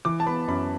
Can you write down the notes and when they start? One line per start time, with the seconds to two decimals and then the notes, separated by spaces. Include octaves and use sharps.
0.05 E3 D6
0.20 A5
0.26 B3 B5
0.48 F#2 B5